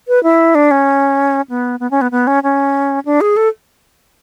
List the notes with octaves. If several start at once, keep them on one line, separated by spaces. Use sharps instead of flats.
B4
E4
D4
C#4
B3
B3
C#4
B3
B3
C#4
C#4
D4
G#4
A4